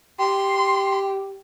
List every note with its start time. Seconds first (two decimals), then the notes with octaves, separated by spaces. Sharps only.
0.20 G4 C6